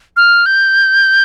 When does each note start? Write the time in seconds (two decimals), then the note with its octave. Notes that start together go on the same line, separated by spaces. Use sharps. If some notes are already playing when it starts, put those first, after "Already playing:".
0.17 F6
0.46 G6